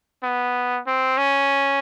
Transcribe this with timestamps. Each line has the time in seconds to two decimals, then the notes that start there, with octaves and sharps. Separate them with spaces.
0.23 B3
0.87 C4
1.17 C#4